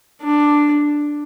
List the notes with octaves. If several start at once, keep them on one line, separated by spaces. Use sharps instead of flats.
D4